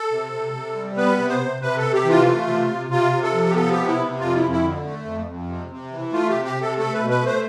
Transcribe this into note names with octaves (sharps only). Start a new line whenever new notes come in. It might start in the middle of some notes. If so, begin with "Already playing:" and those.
Already playing: A4
C3
C3
C3
G3
B3 B4
C3
C5
C3
C3 B4
A4
C3
G4
E3
F4
A3
C3
C3
C3 F4
C3
A4
F3
G4
B3 A4
G4
C3
E4
C3
F2 F4
E4
F2
E4
D3
A3
F2
F2
C3
C3
E3
A3 F4
G4
C3
G4
C3
A4
A3 A4
B4
B2
B4
A3
C5